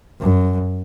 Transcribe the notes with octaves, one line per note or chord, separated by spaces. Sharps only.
F#2